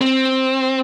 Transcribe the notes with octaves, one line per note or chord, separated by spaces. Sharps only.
C4